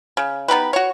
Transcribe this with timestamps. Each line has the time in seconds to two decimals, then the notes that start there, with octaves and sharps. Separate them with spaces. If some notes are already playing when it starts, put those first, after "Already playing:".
0.17 C#3
0.48 B3 D#4 G4 B4
0.73 F#4 C#5